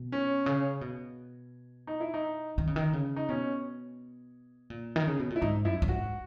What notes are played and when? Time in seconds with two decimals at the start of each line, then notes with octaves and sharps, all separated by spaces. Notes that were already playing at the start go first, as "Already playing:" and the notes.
Already playing: B2
0.12 C#4
0.46 C#3
0.81 B2
1.87 D#4
2.00 E4
2.14 D#4
2.58 D#3
2.67 C#3
2.76 D#3
2.93 C#3
3.16 D#4
3.29 B2 C#4
4.70 A#2
4.96 D#3
5.07 C#3
5.19 B2
5.30 A#2
5.36 E4
5.41 G#2 D#4
5.65 F#2 E4
5.82 F#2
5.88 G#2 F#4